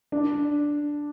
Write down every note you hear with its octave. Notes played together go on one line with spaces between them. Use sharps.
D4